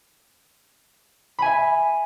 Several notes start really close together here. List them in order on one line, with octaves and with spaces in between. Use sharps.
B5 G#5 E5